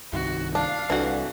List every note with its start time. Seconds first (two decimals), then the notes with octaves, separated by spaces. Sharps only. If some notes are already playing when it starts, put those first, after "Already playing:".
0.13 C2 G2 D#3 F#4
0.55 D4 F5
0.90 C2 E3 D4 F#4 A4 D5